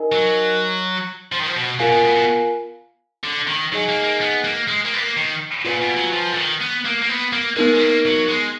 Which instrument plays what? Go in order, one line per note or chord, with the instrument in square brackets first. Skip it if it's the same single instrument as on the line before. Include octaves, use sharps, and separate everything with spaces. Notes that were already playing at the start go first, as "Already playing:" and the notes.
Already playing: [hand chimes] D#4 A#4 D#5 G#5
[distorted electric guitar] F#3
F3
D#3
F3
B2
[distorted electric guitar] B2 [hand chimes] F4 A#4 F5 G#5
[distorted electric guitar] B2
B2
B2
D3
D#3
[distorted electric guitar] F#3 [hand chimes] D#4 G#4 D#5 G#5
[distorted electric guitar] A#3
A#3
B3
A#3
G#3
A#3
B3
A#3
D#3
[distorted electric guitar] A#2 [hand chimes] F4 B4 F5 G#5
[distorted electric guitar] B2
F#3
F3
D3
D#3
B3
A#3
A#3
B3
A#3
[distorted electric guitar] G#3 [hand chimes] B3 D#4 A#4
[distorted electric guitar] G#3
A#3
F#3
G#3